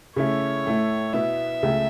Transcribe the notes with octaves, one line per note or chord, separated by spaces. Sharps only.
C#3 A3 C#4 E4 C#5
A2 A3 E4
B2 B3 E4 E5
C#2 C#3 A3